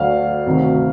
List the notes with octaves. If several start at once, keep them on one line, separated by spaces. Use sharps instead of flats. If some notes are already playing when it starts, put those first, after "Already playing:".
Already playing: D2 D3 F#3 F5
D2 C3 D#3 F#3